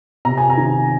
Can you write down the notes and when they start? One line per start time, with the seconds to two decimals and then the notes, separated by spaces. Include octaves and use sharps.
0.25 C3 A#5
0.38 G#5
0.50 A#5
0.57 D#3